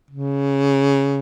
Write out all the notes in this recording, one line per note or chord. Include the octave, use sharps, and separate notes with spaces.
C#3